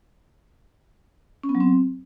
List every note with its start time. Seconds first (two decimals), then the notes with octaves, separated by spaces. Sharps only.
1.44 C#4
1.49 B3
1.55 F#3
1.60 C4